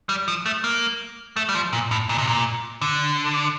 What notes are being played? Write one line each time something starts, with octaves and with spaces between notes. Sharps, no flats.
G3
F3
A3
A#3
A3
G3
F3
A#2
A2
A#2
C3
A#2
D3